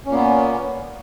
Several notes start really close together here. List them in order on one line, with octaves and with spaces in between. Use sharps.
C#4 A#2 A#3 B3